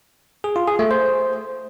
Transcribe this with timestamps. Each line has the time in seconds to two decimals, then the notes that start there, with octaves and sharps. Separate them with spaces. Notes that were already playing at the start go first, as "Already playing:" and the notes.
0.44 G#4
0.56 F4
0.67 G#4
0.79 A3
0.91 C5